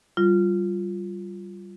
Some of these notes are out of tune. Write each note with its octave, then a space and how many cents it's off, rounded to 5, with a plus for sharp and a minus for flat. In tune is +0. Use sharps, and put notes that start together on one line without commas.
G3 -15 F4 +0